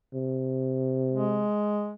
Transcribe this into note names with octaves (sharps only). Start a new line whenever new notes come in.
C3
G#3